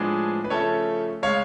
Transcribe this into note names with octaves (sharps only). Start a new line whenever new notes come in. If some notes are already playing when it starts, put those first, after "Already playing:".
Already playing: A2 F3 G#3 B3 D4 G#4 B4
B4
C#3 F3 A3 C#4 A4 C#5
C#3 G#3 C#4 C#5 F5